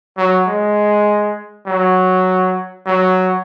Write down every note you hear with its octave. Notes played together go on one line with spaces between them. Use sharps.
F#3
G#3
F#3
F#3